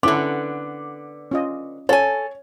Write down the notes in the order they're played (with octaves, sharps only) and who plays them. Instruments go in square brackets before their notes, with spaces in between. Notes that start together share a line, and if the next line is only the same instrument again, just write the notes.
[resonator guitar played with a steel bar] D3 B3 [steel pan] C#4 E4 A4 [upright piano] D6
[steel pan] C#4 F4 D#5
[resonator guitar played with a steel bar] A4 G#5 [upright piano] C#5